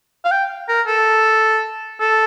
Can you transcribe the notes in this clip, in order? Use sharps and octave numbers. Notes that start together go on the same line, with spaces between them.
F5
G5
A#4
A4
A4